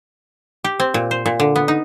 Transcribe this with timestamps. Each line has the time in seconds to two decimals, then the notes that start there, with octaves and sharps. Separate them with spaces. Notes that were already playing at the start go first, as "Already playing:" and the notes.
0.64 G4
0.80 C4
0.94 A#2
1.11 C5
1.26 A#2
1.40 D3
1.56 B3
1.68 D#4